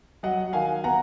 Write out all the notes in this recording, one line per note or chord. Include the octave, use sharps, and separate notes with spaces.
F#3 D#5 F#5
D#3 F5 G#5
B3 F#5 A#5